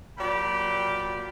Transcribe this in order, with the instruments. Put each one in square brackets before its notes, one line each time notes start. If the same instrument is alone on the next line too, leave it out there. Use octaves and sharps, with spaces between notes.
[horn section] A#2 F#3 G4 D5 G5 B5